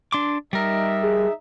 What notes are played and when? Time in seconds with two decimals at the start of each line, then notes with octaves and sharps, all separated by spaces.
0.12 D4 C6 D6
0.53 G3 D#4 A#4 E5
1.03 G#4